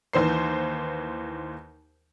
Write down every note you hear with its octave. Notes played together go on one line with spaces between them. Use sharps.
D#2 E3 C5 C7